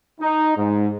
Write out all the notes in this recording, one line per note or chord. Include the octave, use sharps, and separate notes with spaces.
D#4
G#2